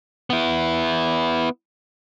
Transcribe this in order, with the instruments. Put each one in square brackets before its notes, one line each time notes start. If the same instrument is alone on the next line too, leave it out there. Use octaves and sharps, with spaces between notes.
[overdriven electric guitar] B3 E4